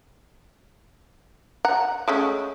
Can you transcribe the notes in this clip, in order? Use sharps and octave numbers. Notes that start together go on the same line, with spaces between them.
F#5 A#5
G#3 A3 C#4